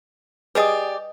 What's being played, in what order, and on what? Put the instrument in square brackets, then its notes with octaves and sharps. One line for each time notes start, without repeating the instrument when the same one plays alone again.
[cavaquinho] G4 G#4 D5 [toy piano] B4 D#5 D#6